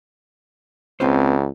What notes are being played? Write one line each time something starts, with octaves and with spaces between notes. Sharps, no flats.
C#2 C4 B4 C5